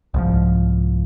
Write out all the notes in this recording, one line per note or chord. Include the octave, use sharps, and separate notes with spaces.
C2 G#2 F3